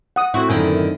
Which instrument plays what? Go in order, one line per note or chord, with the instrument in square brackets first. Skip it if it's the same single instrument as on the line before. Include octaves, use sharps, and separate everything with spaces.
[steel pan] F#5 D#6
[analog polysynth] A2 C4 E4 [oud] F#4
[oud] F#2 D3 D#3 [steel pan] G#5